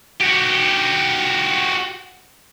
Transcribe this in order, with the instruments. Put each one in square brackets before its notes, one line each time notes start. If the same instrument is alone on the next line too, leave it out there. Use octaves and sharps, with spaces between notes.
[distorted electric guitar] F#4 G4